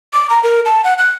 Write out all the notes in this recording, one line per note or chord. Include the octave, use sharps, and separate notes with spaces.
D6
A#5
A#4
A5
F#5
F#6